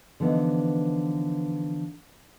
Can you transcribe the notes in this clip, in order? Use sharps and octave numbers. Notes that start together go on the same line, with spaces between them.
D3 E3 F3 B3 D#4